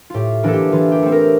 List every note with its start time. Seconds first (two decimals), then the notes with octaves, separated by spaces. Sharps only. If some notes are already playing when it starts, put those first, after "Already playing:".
0.10 A2 F4 G4
0.43 E3 A#3 D4 A4
0.53 G4
0.72 E3 F4
0.92 G4
1.03 A3 C4
1.12 A#4